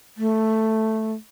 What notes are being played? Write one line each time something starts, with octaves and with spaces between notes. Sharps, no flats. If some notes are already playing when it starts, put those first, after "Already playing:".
A3